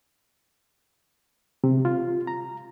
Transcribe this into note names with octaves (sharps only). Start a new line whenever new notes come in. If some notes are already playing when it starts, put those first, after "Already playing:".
C3
F4
A#5